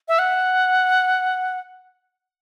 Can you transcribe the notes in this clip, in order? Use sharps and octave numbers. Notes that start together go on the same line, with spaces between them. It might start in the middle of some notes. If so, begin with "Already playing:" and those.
E5
F#5